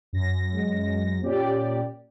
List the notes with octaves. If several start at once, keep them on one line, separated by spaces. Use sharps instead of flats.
F#2 A#6
G#3
A#2 C#4 G4 D5